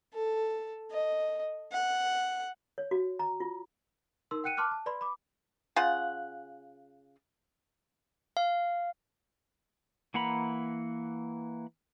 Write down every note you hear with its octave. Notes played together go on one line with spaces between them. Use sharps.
A4
D#5
F#5
C#5
F#4
A#5
F4
D#4 A#4 C6 E6
F#5 G5 F#6 C#7 D#7
A5 C6 D6 F6 F#6
A5
B4 D5 B5 C6
B5 D6
C#3 F4 F#5
F5
E3 A#3 F#5 A#5 B5